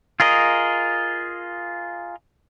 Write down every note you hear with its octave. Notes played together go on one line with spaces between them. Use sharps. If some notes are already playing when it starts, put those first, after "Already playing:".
F4 G#4 A#4 D#5